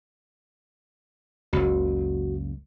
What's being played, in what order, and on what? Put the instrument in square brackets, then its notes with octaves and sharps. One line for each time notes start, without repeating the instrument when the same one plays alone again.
[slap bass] F#1 C#2 [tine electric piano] F#4